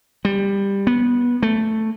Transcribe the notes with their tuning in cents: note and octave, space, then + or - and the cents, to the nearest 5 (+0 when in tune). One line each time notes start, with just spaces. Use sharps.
G3 +15
B3 -20
A3 +5